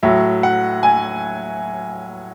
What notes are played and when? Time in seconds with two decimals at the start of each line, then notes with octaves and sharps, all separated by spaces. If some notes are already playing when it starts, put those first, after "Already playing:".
0.03 A2 F#3 E5
0.43 F#5
0.83 G#5